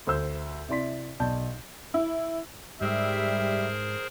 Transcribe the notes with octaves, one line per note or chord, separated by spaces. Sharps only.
D2 C5 E6 G6
C3 E4 D5 C6 B6
B1 D5 A5 G6
E4
G#2 G3 G#4 A#4 C5 E5